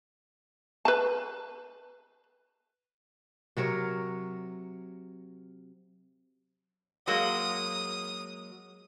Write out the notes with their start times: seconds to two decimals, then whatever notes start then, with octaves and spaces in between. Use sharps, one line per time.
0.85 B4 A5
3.57 C3 F#3 A#4 C#5
7.07 F#3 G#3 A#3 D#6